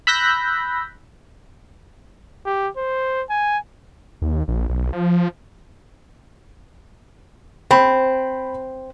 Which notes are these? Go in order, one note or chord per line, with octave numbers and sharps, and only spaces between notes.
B5 E6 F#6 G6 A#6 B6
G4
C5
G#5
D#2
A#1
B1
F3
C4 C5 B5